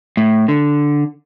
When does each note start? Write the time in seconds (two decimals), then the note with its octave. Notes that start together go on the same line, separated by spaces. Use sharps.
0.17 A2
0.48 D3